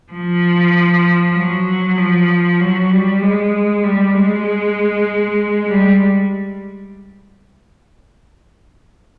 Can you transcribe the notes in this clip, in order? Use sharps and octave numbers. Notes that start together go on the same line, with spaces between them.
F3
F#3
F3
F#3
G3
G#3
G3
G#3
G3